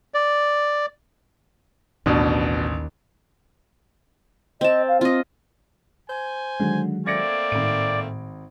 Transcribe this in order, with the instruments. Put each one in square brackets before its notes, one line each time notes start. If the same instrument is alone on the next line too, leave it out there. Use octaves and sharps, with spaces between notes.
[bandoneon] D5
[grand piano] A1 [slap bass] D#2 [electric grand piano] B2 D4
[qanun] C4 A5 [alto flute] D#5
[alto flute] F5
[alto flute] C4 [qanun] F4 D#5
[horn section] C5 G#5
[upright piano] D3 [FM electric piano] D#3 F#3 G#3
[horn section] A3 A#3 C4 [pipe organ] D5 [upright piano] G#6 A#6 C#7
[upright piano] G#1 D7 [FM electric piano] A2